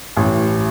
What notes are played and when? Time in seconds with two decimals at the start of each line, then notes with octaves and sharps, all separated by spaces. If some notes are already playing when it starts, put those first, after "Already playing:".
0.17 A1